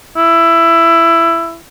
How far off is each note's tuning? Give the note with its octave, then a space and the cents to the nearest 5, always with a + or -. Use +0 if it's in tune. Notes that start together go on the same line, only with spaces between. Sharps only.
E4 +15